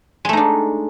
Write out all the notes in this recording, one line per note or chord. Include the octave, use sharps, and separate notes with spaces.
G#3 A3 D4 D#4